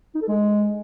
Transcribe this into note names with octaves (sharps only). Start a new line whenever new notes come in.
D#4
A4
G#3